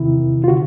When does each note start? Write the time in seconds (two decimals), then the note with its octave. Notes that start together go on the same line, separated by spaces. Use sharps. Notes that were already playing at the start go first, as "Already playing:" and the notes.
Already playing: E2 C3 D#3 E4
0.44 F4
0.48 D3 F#4